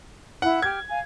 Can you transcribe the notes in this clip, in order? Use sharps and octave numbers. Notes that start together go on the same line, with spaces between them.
E4 F#5
G4 F6 G#6
F5 G#5